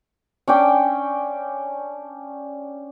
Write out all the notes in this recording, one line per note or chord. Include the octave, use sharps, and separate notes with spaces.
C#4 D4 G5 D6